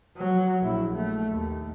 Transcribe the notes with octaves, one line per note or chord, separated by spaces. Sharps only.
F#3
A#1 E4
A3
D#2